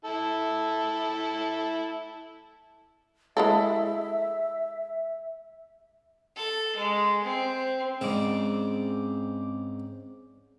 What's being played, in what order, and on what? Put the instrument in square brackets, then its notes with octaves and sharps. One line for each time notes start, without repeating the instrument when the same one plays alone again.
[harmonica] E4 A4
[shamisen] G#3 E4 A4 [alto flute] E5
[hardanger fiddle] A4
G#3
C4
[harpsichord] G#2 C#3 [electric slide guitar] C4 D5